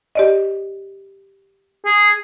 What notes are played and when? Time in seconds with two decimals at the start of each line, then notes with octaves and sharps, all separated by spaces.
0.15 G4 D5 D#5
1.85 G#4